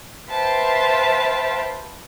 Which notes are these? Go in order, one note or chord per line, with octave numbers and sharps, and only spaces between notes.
B4 C5 E5 F5 G5 A5